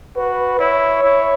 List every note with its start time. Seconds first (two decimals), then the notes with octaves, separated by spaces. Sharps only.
0.17 F#4 B4
0.59 E4 C#5
1.03 E4